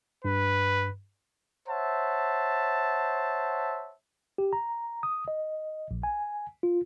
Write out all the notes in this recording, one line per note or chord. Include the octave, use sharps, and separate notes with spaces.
G2 B4
C5 C#5 E5 F#5 A5
G4
A#5
D#6
D#5
A#1
G#5
F4